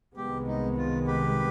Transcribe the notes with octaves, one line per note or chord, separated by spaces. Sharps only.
C2 C3 D#3 G#3 B3 G4
D#4
F4
G4 B4